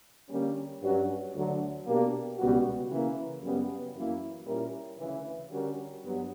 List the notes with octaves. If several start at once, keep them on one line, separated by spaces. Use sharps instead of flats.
D3 G3 A#3 C#4
G2 F#3 C#4 F#4 C#5
D2 D3 F#3
B2 A#3 D4 G4 A#4
C#2 B2 G3 B3 F#4
C#3 E3 A#3
F#2 C#3 G3 B3
F#2 E3 A#3 E4
A#2 G3 C#4 E4 A#4
D2 C#3 E3
D3 G3 C#4 F#4 A#4
G2 F#3 B3